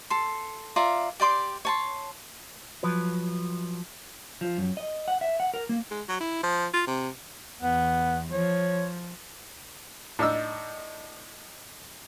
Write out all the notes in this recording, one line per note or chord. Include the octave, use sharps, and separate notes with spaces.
A4 C6
F4 D5 E5 A#5
G4 D5 C6 D6
C#5 A5 C6
F3 F#3 B4
F3
F#2
D#5
F#5
E5
F#5
A#4
A#3
G#3
F#3
E4
F3
F4
C3
E2 B3
F3 C#5
A2 D4 D#4 E6